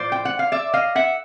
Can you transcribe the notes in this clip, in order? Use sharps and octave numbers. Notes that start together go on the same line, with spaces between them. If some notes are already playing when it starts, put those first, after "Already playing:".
Already playing: A2 F3 C5 D5
G5
F#5
F5
D5 E5
D#5 F5
E5 F#5